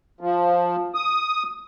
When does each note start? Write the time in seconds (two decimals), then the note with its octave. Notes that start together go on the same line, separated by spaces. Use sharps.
0.21 F3
0.95 D#6